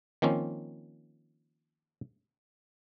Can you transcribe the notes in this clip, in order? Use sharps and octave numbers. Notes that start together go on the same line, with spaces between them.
D#3 F3 A#3 C4 C#4